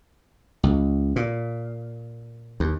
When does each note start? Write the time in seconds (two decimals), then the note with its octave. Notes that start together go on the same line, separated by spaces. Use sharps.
0.63 C#2
1.16 A#2
2.60 D#2